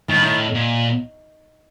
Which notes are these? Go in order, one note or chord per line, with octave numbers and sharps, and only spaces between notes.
A2 D#3
G2
A2
A#2